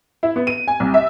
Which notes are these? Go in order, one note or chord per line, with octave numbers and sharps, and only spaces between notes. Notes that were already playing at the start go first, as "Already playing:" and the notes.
E4
B3
D#7
G#5
C2
E5